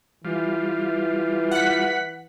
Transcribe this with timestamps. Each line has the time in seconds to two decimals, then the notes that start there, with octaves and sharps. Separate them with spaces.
0.25 E3 G3 F4
1.51 F#5 F#6 B6